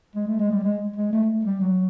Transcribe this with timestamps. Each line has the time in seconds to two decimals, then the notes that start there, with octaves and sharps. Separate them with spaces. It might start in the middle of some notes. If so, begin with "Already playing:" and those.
0.16 G#3
0.27 A3
0.39 G#3
0.52 G3
0.64 G#3
0.96 G#3
1.13 A3
1.45 G3
1.61 F#3